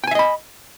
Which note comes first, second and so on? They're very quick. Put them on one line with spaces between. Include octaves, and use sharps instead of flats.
G5 G#5 E5 D#5 B5